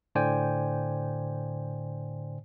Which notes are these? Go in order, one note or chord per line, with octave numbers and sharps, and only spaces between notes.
A2 D3 C5 D5 G5 G#5